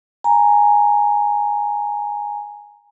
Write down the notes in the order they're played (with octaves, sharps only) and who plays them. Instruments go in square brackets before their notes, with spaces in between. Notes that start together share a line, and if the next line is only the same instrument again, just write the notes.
[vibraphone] G#5 A#5